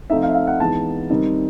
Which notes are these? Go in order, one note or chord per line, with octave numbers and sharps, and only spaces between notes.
F3 A3 C4 D#4 E5
F5
E5
F5
F#5
E3 G#3 B3 D#4 A5
D#3 G3 C4 D#4